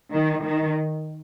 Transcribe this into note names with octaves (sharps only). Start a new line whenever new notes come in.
D#3
D#3